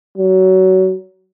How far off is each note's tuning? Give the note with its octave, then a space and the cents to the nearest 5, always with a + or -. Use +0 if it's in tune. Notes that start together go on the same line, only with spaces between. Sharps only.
F#3 +25